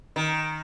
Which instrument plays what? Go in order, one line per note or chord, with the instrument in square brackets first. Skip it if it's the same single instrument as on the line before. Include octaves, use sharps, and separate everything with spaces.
[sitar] D#3